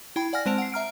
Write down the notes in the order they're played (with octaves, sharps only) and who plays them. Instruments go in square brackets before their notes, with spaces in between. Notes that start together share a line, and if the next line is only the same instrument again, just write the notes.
[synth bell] E4 G5 B5
D5 F#5 G#5 F6 A#6
G#3 C4 C5 A5 D7 F7
F#5 C7
E5 A#5 F6 D7